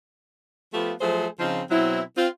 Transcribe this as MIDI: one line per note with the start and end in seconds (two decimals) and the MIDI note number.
0.74 0.92 53
0.74 0.92 57
0.74 0.92 59
0.74 0.92 65
0.74 0.92 67
1.01 1.26 53
1.01 1.26 54
1.01 1.26 57
1.01 1.26 68
1.01 1.26 69
1.01 1.26 72
1.39 1.61 49
1.39 1.61 53
1.39 1.61 60
1.39 1.61 63
1.39 1.61 65
1.71 2.01 47
1.71 2.01 54
1.71 2.01 60
1.71 2.01 64
2.16 2.28 60
2.16 2.28 65